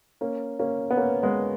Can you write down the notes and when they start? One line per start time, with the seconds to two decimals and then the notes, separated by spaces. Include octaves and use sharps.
0.21 A#3 C#4
0.59 A#3 C#4
0.91 B3
0.97 A#3 C#4
1.23 G#3 B3